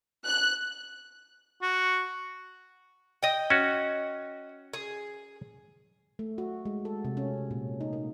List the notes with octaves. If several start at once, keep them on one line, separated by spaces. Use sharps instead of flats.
F#6
F#4
D#5 G5
C#4 F#4
G#4
A3
F#4
G#3
A4
C3
C#4
A#2
D#4
A#3